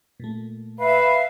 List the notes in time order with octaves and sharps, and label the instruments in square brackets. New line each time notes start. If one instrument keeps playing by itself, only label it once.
[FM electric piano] A#2 A3
[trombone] B4 [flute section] E5 F5